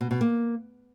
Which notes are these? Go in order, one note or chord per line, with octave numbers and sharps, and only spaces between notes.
B2
B2
A#3